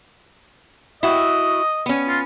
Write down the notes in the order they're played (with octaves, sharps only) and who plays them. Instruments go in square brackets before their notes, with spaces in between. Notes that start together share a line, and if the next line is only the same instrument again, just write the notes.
[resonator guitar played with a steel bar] E4 F#4 [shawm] D#5
[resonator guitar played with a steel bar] B3 C#4
[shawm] F4